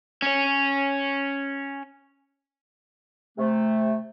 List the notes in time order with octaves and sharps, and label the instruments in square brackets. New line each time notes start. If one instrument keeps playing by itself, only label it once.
[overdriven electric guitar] C#4 C#5
[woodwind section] C3 A3